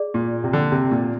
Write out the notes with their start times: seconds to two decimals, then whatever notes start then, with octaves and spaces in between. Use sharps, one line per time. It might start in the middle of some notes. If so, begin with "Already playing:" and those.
Already playing: G#4 D5
0.14 A#2
0.44 C3
0.53 D3
0.72 C3
0.91 A#2